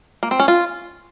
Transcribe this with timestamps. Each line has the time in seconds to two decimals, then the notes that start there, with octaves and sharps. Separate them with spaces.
0.23 A#3
0.31 C4
0.40 C#4
0.48 F4